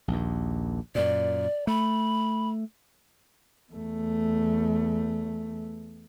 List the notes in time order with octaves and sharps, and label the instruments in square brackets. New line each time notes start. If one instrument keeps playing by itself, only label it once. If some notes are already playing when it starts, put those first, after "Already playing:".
[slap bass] A#1 D#2
[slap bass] F#2 A#2 [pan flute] D5
[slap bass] A3 [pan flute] B5
[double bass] E2 A3